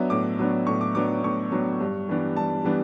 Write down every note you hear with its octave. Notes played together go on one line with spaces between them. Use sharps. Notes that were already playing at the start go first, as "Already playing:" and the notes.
Already playing: F#3 B3 D4 E5
A2 D6
F#3 B3 D4
A2 C#6
D6
F#3 B3 D4 D6
A2 C#6
F#3 B3 D4
G2
E3 G3 B3 D4
G2 A5
E3 G3 B3 D4